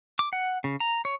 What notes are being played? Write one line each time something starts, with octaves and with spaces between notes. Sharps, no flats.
D6
F#5
C#3
A#5
C#5